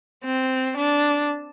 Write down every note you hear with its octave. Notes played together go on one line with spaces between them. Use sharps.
C4
D4